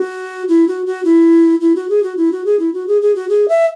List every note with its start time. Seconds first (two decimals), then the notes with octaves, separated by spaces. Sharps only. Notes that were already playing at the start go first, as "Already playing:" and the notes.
Already playing: F#4
0.49 E4
0.68 F#4
0.86 F#4
1.05 E4
1.61 E4
1.76 F#4
1.90 G#4
2.03 F#4
2.17 E4
2.32 F#4
2.45 G#4
2.59 E4
2.74 F#4
2.88 G#4
3.02 G#4
3.15 F#4
3.29 G#4
3.48 E5